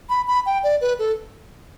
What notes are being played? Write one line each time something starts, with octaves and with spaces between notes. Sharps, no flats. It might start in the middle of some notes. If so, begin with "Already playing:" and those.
B5
B5
G5
D5
B4
A4